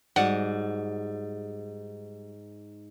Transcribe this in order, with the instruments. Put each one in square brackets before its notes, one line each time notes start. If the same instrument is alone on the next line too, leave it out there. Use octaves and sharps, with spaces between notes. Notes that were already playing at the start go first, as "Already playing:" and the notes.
[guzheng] G#2 [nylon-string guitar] G3 F#4 D5 [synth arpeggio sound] F#5